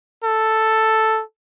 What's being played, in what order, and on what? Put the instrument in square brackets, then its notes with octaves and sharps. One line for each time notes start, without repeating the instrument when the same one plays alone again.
[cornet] A4